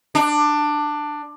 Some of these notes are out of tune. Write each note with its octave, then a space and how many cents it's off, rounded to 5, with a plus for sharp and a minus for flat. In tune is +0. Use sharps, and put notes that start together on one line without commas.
D4 +15